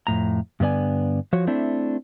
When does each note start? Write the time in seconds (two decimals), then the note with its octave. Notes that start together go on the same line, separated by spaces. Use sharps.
0.07 F2 A2 A#5
0.60 G2 D3 B3 D5 G#5
1.33 F3 F#4 C#5
1.47 A3 C4 D4 E4